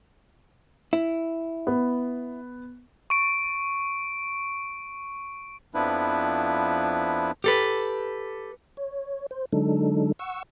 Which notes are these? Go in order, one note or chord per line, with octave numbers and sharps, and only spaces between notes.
E4
B3
C#6 D7
F2 F3 B3 D4 E4 B4
G4 A4 B4
C#5
C5
D3 F#3 G#3 D4 D#4 A4
F#5 C#6 E6